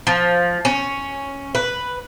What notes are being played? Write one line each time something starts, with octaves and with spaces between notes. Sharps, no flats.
F3
C#4
B4